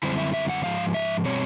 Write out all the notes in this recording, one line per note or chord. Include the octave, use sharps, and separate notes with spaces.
F#2 D3 G3 C4 E4 C5
E5
E5
F#5
G#2 F3 F5
E5
B2 G3 C4 C#5